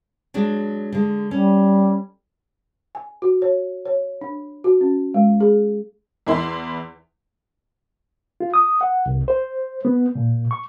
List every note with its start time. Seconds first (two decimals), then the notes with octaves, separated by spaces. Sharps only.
0.34 F#3 G#3 D4
0.93 D3 G#3
1.31 G3 C#4
2.95 G#5
3.22 F#4
3.42 C#5
3.86 C#5
4.21 D4
4.64 F#4
4.81 C#4
5.14 G#3
5.40 G#4
6.27 E2 E4 C6
8.40 F4
8.54 D#6
8.81 F#5
9.06 C2
9.28 C5
9.85 B3
10.15 A#2
10.51 C#6